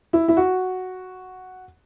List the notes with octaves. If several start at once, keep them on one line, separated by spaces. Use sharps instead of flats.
E4
E4
F#4